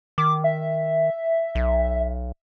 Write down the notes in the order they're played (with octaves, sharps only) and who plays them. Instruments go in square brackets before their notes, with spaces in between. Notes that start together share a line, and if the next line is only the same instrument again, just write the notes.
[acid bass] D#3 [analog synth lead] D6
[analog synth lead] E5
[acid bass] B1